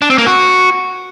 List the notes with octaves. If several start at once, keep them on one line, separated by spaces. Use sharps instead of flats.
D4
C4
A#3
F#4